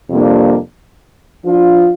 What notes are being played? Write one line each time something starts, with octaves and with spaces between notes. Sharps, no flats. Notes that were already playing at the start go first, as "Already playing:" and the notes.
F2 C3 G3 A#3 D4
F3 D4 F4